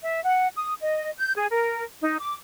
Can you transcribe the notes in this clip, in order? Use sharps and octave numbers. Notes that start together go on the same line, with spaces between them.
E5
F#5
D#6
D#5
G6
G#4
A#4
D#4
D6